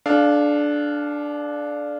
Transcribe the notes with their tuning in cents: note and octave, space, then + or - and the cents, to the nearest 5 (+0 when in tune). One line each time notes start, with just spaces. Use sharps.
D4 +0 A4 -40 F5 +0